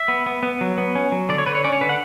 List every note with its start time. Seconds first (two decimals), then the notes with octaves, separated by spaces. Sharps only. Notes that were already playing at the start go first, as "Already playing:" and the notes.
Already playing: E5
0.08 B3
0.26 B3
0.43 B3
0.61 F#3
0.78 B3
0.95 C#4
1.12 F#3
1.29 D3 D5
1.38 C#5
1.46 D3 B4
1.55 C#5
1.64 C#4 D5
1.73 C#5
1.81 D3 B4
1.89 F#5